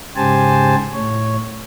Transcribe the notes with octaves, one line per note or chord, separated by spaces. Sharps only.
G#2 C#3 G4 C5 G#5 A5
A2 C#5